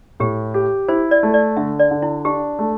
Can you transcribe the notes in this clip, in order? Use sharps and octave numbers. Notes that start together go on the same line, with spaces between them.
A2 G4
G4
E4 C5
D5
A3
D5
D3 E5
D5
D3
E4
D4 G4
A3